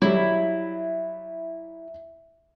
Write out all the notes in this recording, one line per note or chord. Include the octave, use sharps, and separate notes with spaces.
F#3 G3 E4